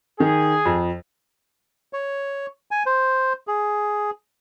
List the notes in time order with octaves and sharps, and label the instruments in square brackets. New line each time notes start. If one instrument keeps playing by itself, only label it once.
[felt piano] D#3 [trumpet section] G#4
[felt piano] F2
[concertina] C#5
G#5
C5
G#4